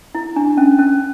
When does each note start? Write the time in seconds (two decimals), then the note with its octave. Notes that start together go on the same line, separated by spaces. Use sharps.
0.15 E4
0.36 D4
0.57 C#4
0.79 C#4